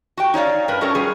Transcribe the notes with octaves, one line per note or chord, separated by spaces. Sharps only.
F#4 G4 G5
D#4 C#5 D5 F5
G2 A#4 B4
C#4 D#4 F#4 A4 A#4 C#5
G3 F4 G#4